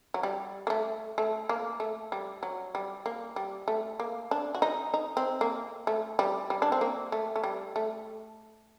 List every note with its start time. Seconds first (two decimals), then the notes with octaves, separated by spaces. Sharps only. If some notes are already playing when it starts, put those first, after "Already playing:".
0.14 F#3
0.23 G3
0.67 A#3
0.70 A3
1.18 A3
1.49 A#3
1.80 A3
2.12 G3
2.43 F#3
2.75 G3
3.06 A#3
3.36 G3
3.68 A3
4.00 A#3
4.31 D4
4.55 F#4
4.62 D#4
4.94 D#4
5.17 C4
5.41 A#3
5.87 A3
6.19 G3
6.50 G3
6.62 D4
6.72 C4
6.81 A#3
7.12 A3
7.36 A3
7.44 G3
7.76 A3